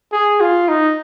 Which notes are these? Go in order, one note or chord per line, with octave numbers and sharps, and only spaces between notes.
G#4
F4
D#4